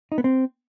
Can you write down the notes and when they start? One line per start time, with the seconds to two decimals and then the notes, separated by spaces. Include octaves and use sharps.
0.12 D#4
0.18 B3
0.24 C4